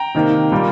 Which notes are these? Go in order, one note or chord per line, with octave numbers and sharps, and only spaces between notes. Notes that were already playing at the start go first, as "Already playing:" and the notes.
Already playing: G5 A#5
C3 D#3 A#3
A#2 G3 A#3